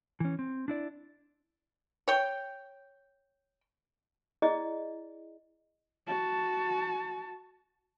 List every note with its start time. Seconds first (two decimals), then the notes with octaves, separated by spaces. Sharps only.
0.20 E3 C#4
0.39 C4
0.68 D4 E4 D5
2.08 C#5 G5
4.42 E4 G#4 D5 D#5
6.07 F#4 A5